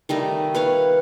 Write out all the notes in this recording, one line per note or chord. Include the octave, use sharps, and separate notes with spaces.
D#3 G3 A3 D#5
B4 C#5 F5